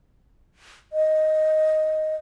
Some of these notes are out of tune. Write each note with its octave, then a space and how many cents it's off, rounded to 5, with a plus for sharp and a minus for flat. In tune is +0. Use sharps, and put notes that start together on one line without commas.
D#5 +5